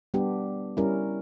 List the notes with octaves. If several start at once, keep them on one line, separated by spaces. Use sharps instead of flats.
G3 B3 D4 G4
G3 C#4 E4 A#4